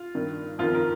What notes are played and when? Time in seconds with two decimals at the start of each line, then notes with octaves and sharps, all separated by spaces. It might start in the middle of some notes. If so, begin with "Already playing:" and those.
Already playing: F4
0.15 G2 D#3
0.59 F2 D#3 F4
0.74 A#4